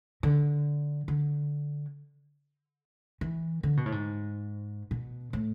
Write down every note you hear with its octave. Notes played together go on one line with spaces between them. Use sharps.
D3
D3
E3
D3
B2
A2
G#2
B2
A2